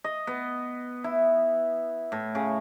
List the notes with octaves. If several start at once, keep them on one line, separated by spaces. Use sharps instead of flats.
D#5
B3
E4
A2
C#3